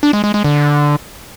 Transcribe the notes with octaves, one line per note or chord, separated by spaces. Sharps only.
D4
G#3
G#3
G#3
D3